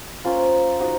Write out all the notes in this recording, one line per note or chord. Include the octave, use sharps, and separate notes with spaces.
A#3 C#4 F4 C5
D#4 F#4 C5